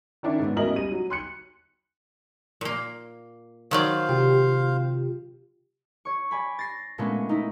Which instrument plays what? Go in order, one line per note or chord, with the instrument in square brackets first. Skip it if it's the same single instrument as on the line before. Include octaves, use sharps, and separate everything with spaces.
[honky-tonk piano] D#3 C#4 D4 E4
G#2 B3
A1 F#3 E4 A#4 D#5 F#7
G3 D#7
F#3
C6 F#6 C#7
[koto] A#2 A#3
[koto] D#3 F#3 D5 [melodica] C5 F5
[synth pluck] C3 F4 G4
[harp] C#5 C#6
D5 G#5 B5
A6 A#6 C7
A#2 G#3 A3 B3 C#4 D4
D#4 E4